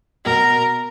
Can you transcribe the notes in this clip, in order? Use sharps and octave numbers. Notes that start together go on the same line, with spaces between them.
B2 A#4